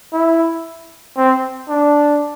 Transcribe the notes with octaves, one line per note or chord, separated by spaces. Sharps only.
E4
C4
D4